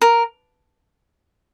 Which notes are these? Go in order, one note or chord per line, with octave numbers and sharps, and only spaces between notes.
A#4